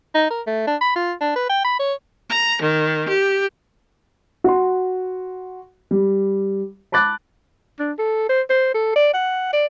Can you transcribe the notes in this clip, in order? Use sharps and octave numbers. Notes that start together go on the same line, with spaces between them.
D#4
A#4
A3
D4
B5
F4
D4
B4
G5
B5
C#5
A#5
D#3
G4
F#4 C6
G3
A5 B5 D6 F#6 A6
D4
A4
C5
C5
A4
D5
F#5
D5